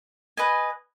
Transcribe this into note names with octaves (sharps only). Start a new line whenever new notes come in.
B4 D#5 G#5